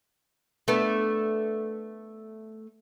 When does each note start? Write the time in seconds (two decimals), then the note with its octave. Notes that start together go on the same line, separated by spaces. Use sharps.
0.68 A3 B3 D4